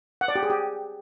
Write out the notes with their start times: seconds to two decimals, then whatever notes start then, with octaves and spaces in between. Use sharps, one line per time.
0.21 F#5
0.28 D5
0.36 G4
0.43 G#4
0.50 G4